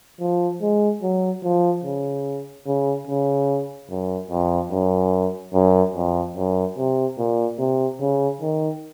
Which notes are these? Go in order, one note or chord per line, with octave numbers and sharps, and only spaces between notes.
F3
G#3
F#3
F3
C#3
C#3
C#3
F#2
F2
F#2
F#2
F2
F#2
C3
A#2
C3
C#3
D#3